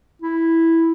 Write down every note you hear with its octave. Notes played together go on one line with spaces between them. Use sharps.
E4